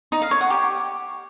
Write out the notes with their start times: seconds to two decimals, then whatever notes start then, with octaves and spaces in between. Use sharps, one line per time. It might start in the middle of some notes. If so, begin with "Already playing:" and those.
0.12 D#4
0.22 F5
0.31 C#5
0.41 F#5
0.50 G4